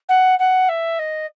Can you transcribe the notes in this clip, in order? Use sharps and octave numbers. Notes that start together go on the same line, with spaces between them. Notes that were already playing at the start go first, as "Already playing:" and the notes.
F#5
F#5
E5
D#5